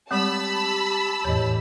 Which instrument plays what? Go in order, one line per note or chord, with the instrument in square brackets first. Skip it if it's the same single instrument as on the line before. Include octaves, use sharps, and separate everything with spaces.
[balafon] G3 G#3 C4 [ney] G4 [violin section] A5 B5 E6
[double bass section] E2 A2 [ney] G4 [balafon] C#5 D#5